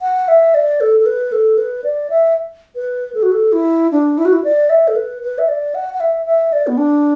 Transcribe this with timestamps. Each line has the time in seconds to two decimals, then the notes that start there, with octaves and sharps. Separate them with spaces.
0.02 F#5
0.28 E5
0.54 D5
0.81 A4
1.00 A4
1.06 B4
1.32 A4
1.58 B4
1.84 D5
2.10 E5
2.75 B4
3.15 A4
3.23 F#4
3.32 A4
3.53 E4
3.92 D4
4.18 E4
4.25 F#4
4.33 E4
4.44 D5
4.70 E5
4.88 A4
4.96 B4
5.22 B4
5.38 E5
5.48 D5
5.75 F#5
5.94 F#5
6.00 E5
6.26 E5
6.53 D5
6.67 B3
6.78 D4